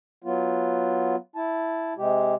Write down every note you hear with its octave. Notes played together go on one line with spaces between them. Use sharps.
F#3 B3 F4
E4 A5
C3 G#3 G4